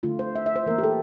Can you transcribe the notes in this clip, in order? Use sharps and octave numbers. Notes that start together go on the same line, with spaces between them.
D3 A3 F4
C5
E5
E5
C5
E3 A#3 A#4
G4
A4